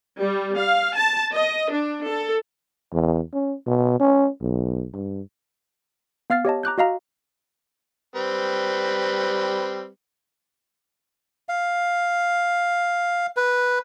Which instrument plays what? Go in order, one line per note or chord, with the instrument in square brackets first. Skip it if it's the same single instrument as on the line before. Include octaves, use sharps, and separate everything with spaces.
[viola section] G3
F5
A5
D#5
D4
A4
[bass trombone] E2
C#4
B2
C#4
B1
G2
[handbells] B3 F5 F6 A6 C7
G4 C#5 D#5 A5
A#5 D6 F#6 G6
F#4 D#5 F5 A#5
[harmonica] G3 C4 B4
[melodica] F5
B4